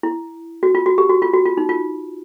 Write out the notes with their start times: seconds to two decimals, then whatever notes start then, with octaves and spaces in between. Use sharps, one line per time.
0.03 E4
0.63 F#4
0.75 F4
0.86 F#4
0.98 G4
1.10 F#4
1.22 F4
1.33 F#4
1.45 F4
1.57 D#4
1.69 F4